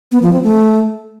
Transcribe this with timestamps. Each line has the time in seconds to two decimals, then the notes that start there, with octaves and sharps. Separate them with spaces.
0.12 B3
0.22 F3
0.33 C4
0.43 A3